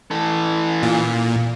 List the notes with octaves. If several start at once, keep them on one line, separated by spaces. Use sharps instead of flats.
E3 A4
A#2